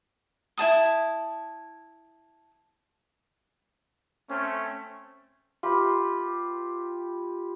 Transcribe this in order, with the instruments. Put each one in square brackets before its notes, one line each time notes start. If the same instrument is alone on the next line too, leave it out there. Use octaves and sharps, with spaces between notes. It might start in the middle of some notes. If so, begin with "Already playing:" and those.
[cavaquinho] E4 C#5 A5 D#6
[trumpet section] A3 C4 C#4
[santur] F4 G4 B4